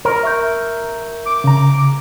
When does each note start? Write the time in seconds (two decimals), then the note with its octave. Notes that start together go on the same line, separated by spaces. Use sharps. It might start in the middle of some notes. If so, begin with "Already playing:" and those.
0.05 A#4
0.23 E5 C#6 G6
1.26 D6
1.44 C#3 A#5